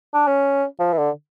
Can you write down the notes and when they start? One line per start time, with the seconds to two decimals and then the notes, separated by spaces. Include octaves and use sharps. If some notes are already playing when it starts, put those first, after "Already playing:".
0.14 D4
0.27 C#4
0.79 F3
0.93 E3
0.98 D3